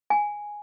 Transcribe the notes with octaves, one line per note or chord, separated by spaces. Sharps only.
G#5